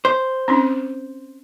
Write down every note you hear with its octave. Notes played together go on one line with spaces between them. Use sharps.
C5
C4 C#4 D#4